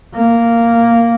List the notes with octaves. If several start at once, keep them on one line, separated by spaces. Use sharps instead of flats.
A#3